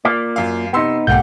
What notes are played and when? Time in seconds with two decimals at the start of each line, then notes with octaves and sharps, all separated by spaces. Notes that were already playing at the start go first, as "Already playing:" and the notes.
0.05 A#3 F4 D5
0.36 F#2 F5
0.73 C3 B3 D#4 C6 E6
1.07 B1 G#2 A3 A#3 G4 F#5 G6